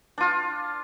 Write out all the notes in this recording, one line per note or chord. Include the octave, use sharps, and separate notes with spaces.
D4 F4